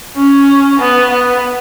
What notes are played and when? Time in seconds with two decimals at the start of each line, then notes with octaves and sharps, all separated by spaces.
0.17 C#4
0.79 B3
1.10 B3